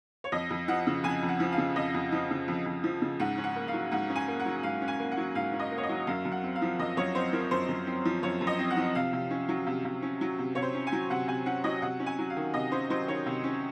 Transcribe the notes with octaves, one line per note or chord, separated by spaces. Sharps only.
C#5
F2 D#5
F2
F3 F#5
C#3
F2 G#5
F2
F#5
F3
F5
C#3
F2 D#5
F2
F3
C#3
F2
F2
F3
C#3
G#2 F#5
C#4
F#5
A#3
F5
F#3
G#2 F#5
C#4
G#5
A#3
F#5
F#3
G#2 F5
C#4
G#5
A#3
F#5
F#3
G#2 F5
C#4
D#5
A#3
C#5
D#5
F#3
F#2 F5
F#2
F#5
C4
F5
F3
F#2 D#5
F#2 C#5
C4 C5
F3 A#4
F#2 C5
F#2
C4
F3
F#2 C#5
F#2
D#5
C4
F#5
F3
C3 F5
C3
C#4
F#3
C3
C3
C#4
F#3
C3
C3 C#5
C5
C#4
G#5
F#3
C3 F#5
C3 G#5
C#4 F#5
F#3 D#5
C3 F#5
C#4
G#5
F#3
F5
D#3
C3 D#5
C#4 C5
F#3 C5
D#3 C#5
C3
C#4